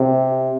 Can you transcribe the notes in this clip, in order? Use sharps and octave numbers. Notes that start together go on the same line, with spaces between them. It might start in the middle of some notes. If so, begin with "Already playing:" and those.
Already playing: C3